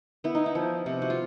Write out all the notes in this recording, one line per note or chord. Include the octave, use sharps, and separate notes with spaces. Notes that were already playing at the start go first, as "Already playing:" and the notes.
B3 E4
D#4
E4
F3
C3
F#4
F4